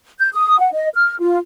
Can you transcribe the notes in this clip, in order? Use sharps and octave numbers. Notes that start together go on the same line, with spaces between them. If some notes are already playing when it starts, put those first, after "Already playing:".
G6
D#6
F#5
D#5
F6
F4